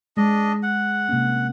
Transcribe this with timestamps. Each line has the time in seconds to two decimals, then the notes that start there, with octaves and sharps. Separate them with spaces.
0.17 G#3 D4 D#5
0.63 F#5
1.09 C3 A#3 C#4